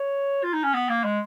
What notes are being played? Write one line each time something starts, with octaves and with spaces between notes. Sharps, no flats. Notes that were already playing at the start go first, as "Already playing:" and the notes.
Already playing: C#5
F4
D#4
C#4
B3
A#3
G#3